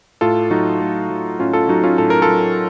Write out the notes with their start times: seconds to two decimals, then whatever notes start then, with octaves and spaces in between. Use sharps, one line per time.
0.21 A2 F4 A4
0.51 F#3 D#4 F#4
0.81 A2
1.10 F#3
1.39 A2 C#4 F4
1.53 F4 A4
1.68 F#3 D#4 F#4
1.84 C#4 F4
1.98 A2 A4
2.10 A#4
2.22 F4 A4
2.27 F#3